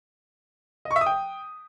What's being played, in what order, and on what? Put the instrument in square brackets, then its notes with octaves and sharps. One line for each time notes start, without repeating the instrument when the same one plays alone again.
[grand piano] D#5
C#6
E5
D#6
G5